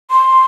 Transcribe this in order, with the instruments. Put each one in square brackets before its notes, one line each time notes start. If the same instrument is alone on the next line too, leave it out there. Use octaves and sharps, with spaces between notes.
[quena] C6